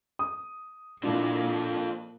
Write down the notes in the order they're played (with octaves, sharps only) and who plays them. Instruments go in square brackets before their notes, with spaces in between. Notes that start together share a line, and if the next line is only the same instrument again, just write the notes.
[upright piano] D#6
[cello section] A#2 A#3 [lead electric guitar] F3 A4 [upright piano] D4 E4